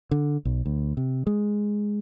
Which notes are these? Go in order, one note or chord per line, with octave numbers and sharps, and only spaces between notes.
D3
B1
D2
C3
G#3